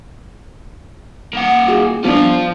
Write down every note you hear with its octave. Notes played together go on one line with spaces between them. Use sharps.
A#3 F#5
F4 F#4 G#4
G3 B3 D4 F4 C5